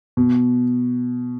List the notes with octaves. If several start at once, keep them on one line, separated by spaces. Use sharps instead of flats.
B2